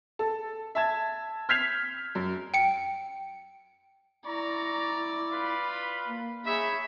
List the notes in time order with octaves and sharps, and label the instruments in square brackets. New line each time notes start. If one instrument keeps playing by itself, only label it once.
[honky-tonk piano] A4
E5 A5 G#6
F6 G6 G#6 B6 C7 F7
F#2
[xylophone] G5 C#7
[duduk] E4 [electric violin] D5 [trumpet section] A#5 C#6
[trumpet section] F4 B4 B5
[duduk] A#3
[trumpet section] D#4 C#5 E5 [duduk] G#4 [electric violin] B5